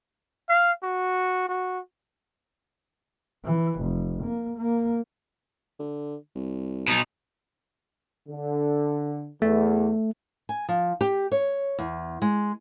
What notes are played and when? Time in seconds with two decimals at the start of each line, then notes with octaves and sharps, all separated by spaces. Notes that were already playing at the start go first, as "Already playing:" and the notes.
0.49 F5
0.83 F#4
1.49 F#4
3.45 E3
3.80 F1
4.23 A#3
4.57 A#3
5.79 D3
6.35 C2
6.88 B2 D#4
8.29 D3
9.42 E2 A3
10.49 G#5
10.69 F3
11.01 G4
11.32 C#5
11.79 E2
12.22 G#3